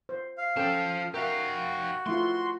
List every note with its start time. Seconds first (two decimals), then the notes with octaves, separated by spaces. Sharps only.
0.09 C5
0.38 F5
0.57 F3 C#4 A4 G5 A5
1.14 F#4 G4 A#4 E5 F5
2.06 A3 E4 F4 C6